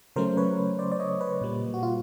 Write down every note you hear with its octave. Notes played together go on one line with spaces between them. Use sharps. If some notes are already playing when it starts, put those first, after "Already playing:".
C#3 F#3 A3 C#4 A#4 C5
B4 C#5
C5 D5
D5
C#5 D#5
B4 C#5
A#2 G3 A#3
F#4
F4